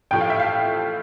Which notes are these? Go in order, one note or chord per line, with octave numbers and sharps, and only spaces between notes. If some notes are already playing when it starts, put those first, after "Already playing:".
A1 A2 F3 A3 G5
F5
E5
F5